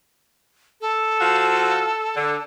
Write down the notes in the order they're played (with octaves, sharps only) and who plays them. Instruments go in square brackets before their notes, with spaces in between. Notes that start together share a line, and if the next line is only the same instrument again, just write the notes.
[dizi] A4
[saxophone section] F3 F#4 F5
D3